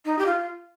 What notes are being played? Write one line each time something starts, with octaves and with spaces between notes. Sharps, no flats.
D#4
G4
F4